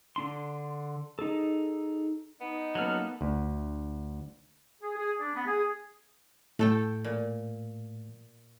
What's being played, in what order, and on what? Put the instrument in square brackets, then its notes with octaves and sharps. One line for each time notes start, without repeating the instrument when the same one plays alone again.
[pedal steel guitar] D3 D4 C6
D#4 G#4 A4
[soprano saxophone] B3 [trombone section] D#4
[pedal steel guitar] F#3 C#4 F6 [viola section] A#3 B3 [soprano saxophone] A4
[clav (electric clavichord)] D2
[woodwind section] G#4
G#4
D4
B3
G#4
[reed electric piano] A2 [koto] A3 A4 G5
[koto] A#2